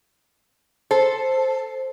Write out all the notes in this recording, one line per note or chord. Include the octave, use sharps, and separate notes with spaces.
A4 C5